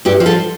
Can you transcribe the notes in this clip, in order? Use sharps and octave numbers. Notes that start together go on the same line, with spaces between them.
G2 E4 G4
F3
F4 A4